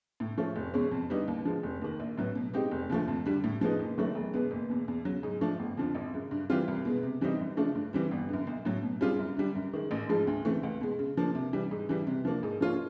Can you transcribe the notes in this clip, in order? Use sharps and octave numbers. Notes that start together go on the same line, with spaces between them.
A2
F3 A3 C#4
F1
E2 B2 G#3 C#4
F2
D3 G3 B3 D#4
D#2
D3 F3 G#3
F1
D#2 D#3
A#1
A2 F#3 B3
B2
G#3 C4 D#4 G4
F1
D#2 D3 F3 A3
F2
D3 G3
A2
F3 G#3 B3 D#4
F#1
F#2 D#3 F#3 A3
E1
E2 B2 G#3 B3
F#1
E2 B2
E2
C#3 F#3
G#2
F3 A3 D4
G1
F2 D3 F3
G#1
F#2 C#3
G2
E3 G3 C4 F4
C2
B2 G#3 B3
C3
E3 G3 C4 D#4
F#2
C#3 F3 A3 D4
G2
E3 G3 C4
G1
F#2 D3
B1
A2 F#3
B2
G3 C4 F4 G#4
F#2
D3 G3
F#2
D#3 G#3
A1
G#2 F3 G#3
D2
C#3 E3 A3 C4
C#2
B2 G#3
C#3
F3 A#3 D4
C3
E3 G3
G#2
E3 G3
C3
F3 A#3 D4
G#2
F3 A#3 C#4 F4